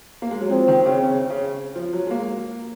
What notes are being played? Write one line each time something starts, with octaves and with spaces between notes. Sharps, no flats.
A#3
G#3
F#3
F3 C4
D#3
C#3
C#3
C#3
F3
F#3
G#3
A#3